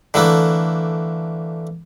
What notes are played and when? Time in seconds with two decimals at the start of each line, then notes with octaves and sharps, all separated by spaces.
0.14 D3 E3 A3 A#3